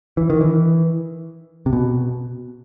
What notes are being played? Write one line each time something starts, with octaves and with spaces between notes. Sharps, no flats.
E3
D#3
E3
C3
B2